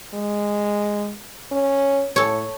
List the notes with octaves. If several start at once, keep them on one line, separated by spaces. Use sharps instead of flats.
G#3
C#4
A2 A4 C#5